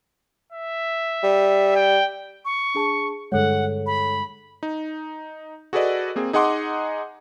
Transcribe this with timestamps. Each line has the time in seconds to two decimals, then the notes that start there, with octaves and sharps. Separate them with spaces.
0.52 E5
1.24 G3
1.76 G5
2.45 C#6
2.75 D4 G#4 A5
3.32 G2 D3 G#3 A4 C#5 F#5
3.86 B5
4.63 D#4
5.73 F#4 G#4 A4 B4 D5 D#5
6.16 A#3 C4 G#4
6.33 D#4 G#4 D#5 F#5 C6 D6